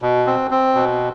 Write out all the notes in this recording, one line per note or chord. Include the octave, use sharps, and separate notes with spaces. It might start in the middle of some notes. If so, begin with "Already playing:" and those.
B2
C4
C4
B2